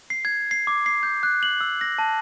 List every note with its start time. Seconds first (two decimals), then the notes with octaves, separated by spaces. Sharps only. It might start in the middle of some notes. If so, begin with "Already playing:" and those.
0.10 C7
0.25 G#6
0.51 C7
0.67 D6
0.86 C7
1.03 G6
1.23 F#6
1.43 F#7
1.61 E6
1.81 A#6
1.98 A5